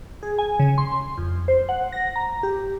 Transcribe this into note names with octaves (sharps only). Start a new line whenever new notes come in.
G#4
G#5
C#3
C6
F2
C5
F#5
A#6
A#5
G4